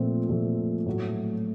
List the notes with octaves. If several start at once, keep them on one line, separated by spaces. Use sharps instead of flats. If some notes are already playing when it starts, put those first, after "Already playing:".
Already playing: A#2 F3 A3 C4
A#2 F3 A3 C4
A2 F#3 A3